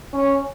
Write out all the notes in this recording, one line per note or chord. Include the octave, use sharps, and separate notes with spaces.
C#4